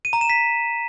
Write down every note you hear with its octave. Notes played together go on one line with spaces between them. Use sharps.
D#7
A#5
E7
B6